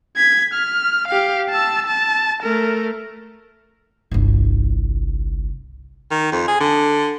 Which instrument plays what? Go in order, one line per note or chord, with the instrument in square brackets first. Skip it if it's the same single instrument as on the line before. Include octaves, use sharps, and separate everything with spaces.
[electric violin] G#6 B6
F6
G4 F5
A5 E6
A5
A3 A#4
[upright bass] G1 C2
[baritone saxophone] D#3
F2
G#4
D3